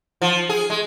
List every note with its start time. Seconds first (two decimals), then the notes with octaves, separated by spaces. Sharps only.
0.22 F3
0.49 G#4
0.70 G#3